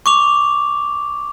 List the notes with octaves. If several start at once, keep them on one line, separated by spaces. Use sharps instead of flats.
C#6 D6 F7